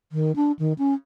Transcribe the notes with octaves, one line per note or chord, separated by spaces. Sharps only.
D#3
D4
D#3
C#4